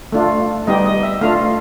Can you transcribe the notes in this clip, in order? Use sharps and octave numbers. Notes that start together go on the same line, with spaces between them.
A3 D4 F4
G3 B3 D#4 G4 D#5
D#5
E5
A3 D4 F4 F5